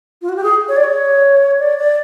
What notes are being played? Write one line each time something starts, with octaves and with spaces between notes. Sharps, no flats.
F4
F#4
G4
G#4
C#5
D5
C#5
D5
D5